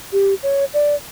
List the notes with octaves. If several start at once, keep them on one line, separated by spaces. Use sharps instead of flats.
G4
C#5
D5